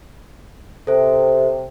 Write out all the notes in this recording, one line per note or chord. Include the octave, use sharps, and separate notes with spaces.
C3 A4 C5